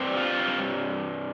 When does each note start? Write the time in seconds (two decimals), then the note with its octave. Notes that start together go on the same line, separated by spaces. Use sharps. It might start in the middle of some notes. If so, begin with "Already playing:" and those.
Already playing: G2 G3 C4
0.17 F4